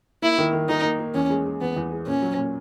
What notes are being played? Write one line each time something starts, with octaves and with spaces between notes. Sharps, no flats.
A#3 E4
D#3
D#3
D#3 D#4
A#3
A#3
E2 C#4
G#3
G#3
E2 B3
E2
G#3
A#2 C#4
F#3
A#2